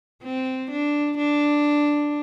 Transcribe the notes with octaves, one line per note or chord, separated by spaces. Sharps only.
C4
D4
D4